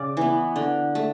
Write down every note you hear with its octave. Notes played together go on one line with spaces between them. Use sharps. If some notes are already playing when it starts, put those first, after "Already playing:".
Already playing: C#3 D5
E3 B3
D3
A3